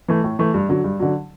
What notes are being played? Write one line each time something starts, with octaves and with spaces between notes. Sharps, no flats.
E3 A3
A2
E3 A3
G2
D3 F#3
G2
D3 F#3